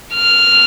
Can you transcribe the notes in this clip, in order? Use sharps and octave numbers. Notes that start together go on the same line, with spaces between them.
F6